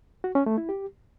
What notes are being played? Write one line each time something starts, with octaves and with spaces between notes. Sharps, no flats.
F#4
C#4
A3
E4
G4